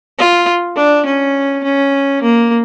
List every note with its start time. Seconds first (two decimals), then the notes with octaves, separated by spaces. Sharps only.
0.18 F4
0.77 D4
1.06 C#4
1.63 C#4
2.22 A#3